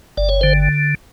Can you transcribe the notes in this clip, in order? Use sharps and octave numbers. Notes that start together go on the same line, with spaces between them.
G1 D5
C#5
D3 C5